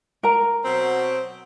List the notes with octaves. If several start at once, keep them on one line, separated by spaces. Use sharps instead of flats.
A#4 A#5
B2 F#3 C4